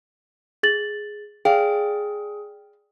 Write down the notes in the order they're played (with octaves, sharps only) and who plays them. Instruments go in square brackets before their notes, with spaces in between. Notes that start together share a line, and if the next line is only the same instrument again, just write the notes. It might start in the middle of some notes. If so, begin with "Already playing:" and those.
[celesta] G#4 A6 F#7
[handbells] G#4 [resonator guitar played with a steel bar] D5 F5 [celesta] G5